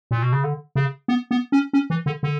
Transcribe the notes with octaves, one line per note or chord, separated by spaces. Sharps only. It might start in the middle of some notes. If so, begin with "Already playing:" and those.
A#2
B2
C#3
D3
C#3
B3
B3
C#4
C#4
E3
D3
D3